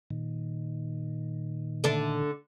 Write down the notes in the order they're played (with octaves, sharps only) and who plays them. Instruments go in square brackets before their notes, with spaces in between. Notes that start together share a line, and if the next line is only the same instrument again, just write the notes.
[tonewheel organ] A#2 D#3
[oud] D3 D4